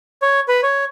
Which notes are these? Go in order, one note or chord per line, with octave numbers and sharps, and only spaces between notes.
C#5
B4
C#5